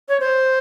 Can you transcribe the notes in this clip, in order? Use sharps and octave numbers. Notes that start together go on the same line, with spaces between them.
C#5
C5